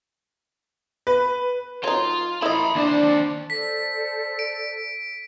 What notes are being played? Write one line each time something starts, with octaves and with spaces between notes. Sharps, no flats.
B4
F#3 D#4 F4
E4 D#5 A#5 B5
D#2 D4 C5
A4 C5 D5 B6
D7